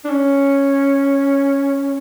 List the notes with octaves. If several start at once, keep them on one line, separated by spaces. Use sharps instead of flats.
D4
C#4